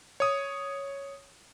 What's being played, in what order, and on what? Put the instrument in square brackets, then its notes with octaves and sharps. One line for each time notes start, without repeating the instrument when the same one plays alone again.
[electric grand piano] C#5 D#6